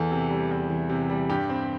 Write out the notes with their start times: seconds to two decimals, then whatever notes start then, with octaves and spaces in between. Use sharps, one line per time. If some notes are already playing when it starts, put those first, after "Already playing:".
Already playing: E2 E3 A4
0.11 C3
0.30 G3
0.51 E2
0.70 E3
0.89 C3
1.10 G3
1.29 G2 G4
1.49 C4